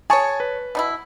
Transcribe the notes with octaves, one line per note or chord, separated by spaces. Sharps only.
G#4 C#5 G#5 A5 C#6
B4
B2 D#4 E4